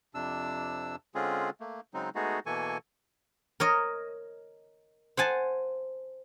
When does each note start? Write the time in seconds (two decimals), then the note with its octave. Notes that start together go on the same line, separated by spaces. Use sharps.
0.14 F2 C3 D4 E6
1.15 D3 G#3 C4 C#4 F4 G#4
1.60 A3 A#3
1.94 C#3 F#3 G#3 C4 D#4
2.15 G#3 A3 B3 D#4 F#4 G#4
2.46 B2 E3 A#3 A4 G#5 C#6
3.60 A#4 C#5 D#5
5.17 C5 F#5 G#5 A5